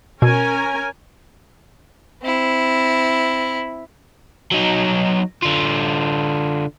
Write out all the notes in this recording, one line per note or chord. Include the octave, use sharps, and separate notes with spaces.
B2 C#4 A#4 G#5
C4 E4
F#3 D#4
D3 F4